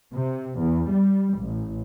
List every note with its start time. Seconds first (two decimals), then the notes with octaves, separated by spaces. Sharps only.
0.14 C3
0.60 E2
0.91 G3
1.38 A1